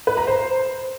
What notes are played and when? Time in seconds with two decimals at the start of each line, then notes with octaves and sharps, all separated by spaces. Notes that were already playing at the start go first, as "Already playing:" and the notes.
0.07 B4
0.17 A#5
0.27 C5